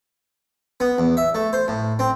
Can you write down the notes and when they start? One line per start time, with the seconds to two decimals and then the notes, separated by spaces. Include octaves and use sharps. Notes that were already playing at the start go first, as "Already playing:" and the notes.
0.80 B3
0.98 E2
1.17 E5
1.35 A3
1.53 C5
1.68 A2
1.99 C4